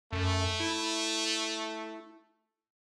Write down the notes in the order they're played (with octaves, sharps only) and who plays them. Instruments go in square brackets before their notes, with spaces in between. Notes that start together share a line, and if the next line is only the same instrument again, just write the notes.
[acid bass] F#2 [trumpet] A3
[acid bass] E4